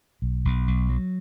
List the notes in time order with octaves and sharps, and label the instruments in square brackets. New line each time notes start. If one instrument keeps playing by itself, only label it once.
[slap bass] B1
B1
B1
F#3